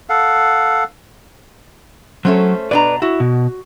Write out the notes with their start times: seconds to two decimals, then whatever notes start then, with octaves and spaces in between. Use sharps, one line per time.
0.09 A4 F5 F#5
2.25 F#3 A3 C#4 C5
2.71 B2 D4 B4 D5 A#5
3.02 E4 F#4
3.20 B2